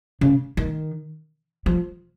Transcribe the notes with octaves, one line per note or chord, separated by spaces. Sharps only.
C#3
D#3
F3